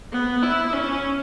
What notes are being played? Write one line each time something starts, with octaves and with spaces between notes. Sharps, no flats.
B3
E4
C#4